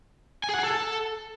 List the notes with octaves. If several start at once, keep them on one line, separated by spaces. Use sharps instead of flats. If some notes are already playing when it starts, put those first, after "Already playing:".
G#5
G#4
F#5
G#4
A4